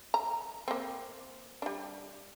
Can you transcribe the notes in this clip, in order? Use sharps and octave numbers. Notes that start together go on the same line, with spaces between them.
A#5
A#3 C4
G3 D4